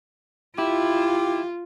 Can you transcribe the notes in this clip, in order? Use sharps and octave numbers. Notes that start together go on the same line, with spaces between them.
E4 F4 G4